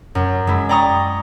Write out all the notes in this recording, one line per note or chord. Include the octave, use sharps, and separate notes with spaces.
F#2
G#3 E4
D5 G5 A#5 C#6 D#6